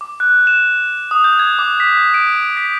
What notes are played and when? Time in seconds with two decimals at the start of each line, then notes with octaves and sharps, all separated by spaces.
0.01 D6
0.20 F#6
0.47 E7
1.11 D#6
1.24 G6
1.39 G#6
1.59 D6
1.80 B6
1.98 G6
2.14 D7
2.57 B6